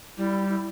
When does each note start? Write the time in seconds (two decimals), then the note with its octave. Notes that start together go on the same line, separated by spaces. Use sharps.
0.17 G3 E4
0.49 E4